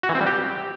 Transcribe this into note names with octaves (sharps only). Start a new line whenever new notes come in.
F#4
E3
C4
G3
G4